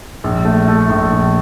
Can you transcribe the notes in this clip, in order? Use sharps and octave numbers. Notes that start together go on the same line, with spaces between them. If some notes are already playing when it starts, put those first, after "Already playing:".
A#1
A3
A3
A#1
A#1